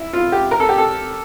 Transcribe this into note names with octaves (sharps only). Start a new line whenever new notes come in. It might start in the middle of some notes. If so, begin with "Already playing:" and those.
Already playing: E4
F4
G4
A#4
A4
G4
A4